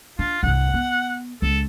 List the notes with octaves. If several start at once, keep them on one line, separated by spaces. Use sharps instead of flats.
D4 F4
C2 G2 F#5
B3
C#2 G#3 A4